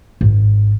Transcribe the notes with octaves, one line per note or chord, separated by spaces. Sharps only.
G#1